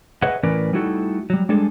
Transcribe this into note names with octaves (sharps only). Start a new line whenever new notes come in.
G#4 B4 C#5 D#5 E5 F#5
A2 E3 C#4 A#4 B4 D5
G3 A3 D#4 E4 F#4 A4
F#3 G3
G3 G#3 D4 G#4 A4